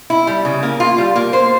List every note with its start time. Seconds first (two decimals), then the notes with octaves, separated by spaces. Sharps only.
0.10 E4
0.27 G3
0.45 C#3
0.63 A#3
0.80 F4
0.98 G3
1.15 A#3
1.33 C5